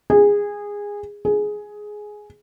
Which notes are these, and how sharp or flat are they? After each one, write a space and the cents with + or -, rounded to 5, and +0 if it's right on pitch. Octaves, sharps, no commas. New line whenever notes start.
G#4 -20
G#4 +10